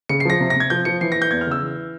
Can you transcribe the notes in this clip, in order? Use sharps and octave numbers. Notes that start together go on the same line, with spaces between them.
C#3 C#7
C7
F3 A#6
C3
A#6
C3 G#6
F3 G6
F3 C#7
E3 C7
A#6
E3
G6
E2 G#6
F6
C#3 E6
E3